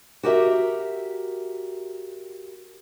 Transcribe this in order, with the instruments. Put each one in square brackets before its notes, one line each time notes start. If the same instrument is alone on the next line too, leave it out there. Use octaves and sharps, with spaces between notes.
[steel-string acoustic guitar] F#4 G4 A#4 E5